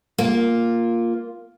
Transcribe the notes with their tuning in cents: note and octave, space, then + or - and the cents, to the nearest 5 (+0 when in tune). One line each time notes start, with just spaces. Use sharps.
A#3 +0 F4 +0